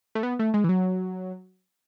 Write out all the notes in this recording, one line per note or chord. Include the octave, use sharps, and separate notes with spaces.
A3
B3
A3
G#3
E3
F#3